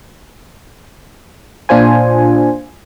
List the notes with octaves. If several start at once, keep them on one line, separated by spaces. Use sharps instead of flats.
A#2 D4 F4 C5 G#5